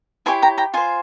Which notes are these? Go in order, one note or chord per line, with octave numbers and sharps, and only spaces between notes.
E4 G4 C#5 G#5 C6
G5 A#5
G5 A#5
F4 C5 G#5 C6